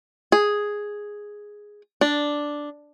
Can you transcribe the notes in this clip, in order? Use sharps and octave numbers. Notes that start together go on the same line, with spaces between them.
G#4
D4